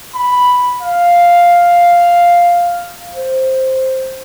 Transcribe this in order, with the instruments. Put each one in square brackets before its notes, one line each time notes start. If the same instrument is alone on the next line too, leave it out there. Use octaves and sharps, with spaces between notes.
[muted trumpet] B5
F5
[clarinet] C5